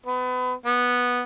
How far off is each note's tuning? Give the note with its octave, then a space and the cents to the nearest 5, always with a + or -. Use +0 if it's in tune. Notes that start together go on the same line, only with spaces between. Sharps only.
B3 +30
B3 -10